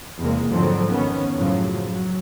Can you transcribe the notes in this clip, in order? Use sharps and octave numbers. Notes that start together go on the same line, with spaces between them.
E2 C3 G#3 A#3
G#1 F2 D3 F3 F#3 C4
D#3 B3 C#4
F#2 A2 C#3 F3 F#3
F#3